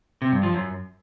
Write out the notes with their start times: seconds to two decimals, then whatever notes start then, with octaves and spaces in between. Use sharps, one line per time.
0.22 C3
0.32 G2
0.43 F3
0.54 F#2